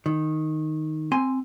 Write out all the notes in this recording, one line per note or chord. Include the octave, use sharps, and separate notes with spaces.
D#3
C4 G#5 C6